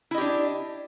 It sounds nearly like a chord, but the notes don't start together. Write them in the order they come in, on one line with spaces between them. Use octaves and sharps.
E4 D#5 G4 D4